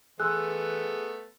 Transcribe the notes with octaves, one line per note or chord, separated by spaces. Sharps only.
E3 A3 B3 G#4 C6 E6 F#6